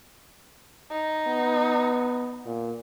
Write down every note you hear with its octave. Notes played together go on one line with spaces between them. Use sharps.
D#4
B3
A#2